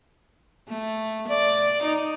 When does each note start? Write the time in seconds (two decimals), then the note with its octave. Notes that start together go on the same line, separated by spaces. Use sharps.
0.68 A3
1.28 D5
1.83 D#4